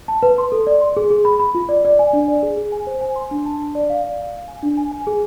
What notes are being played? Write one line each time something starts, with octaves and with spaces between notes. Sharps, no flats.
A5
B4
C6
A4
D5
C6
G#4
G#4
B5
B5
F4
D5
D5
G#5
D4
D5
G#4
G#4
G#5
C5
G#5
C6
D4
A5
D4
D5
F5
D5
F5
F5
G#5
D4
G#5
G#5
G#4